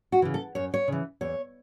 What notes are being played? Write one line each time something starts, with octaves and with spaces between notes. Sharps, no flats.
F#4
C#3 E3
A4
F#2 C#5
C#5
C#3 E3
E2 C#5